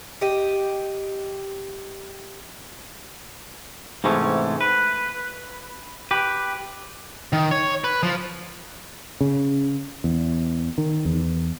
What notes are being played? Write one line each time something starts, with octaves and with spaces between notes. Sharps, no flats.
G4 D#5
G#2 C3 E3 G#3 A3 C#4
B4
G4 B4
D#3
C#5
B4
F3
C#3
E2
D#3
E2